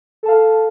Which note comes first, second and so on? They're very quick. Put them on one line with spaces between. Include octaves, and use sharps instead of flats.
A4 A5 F5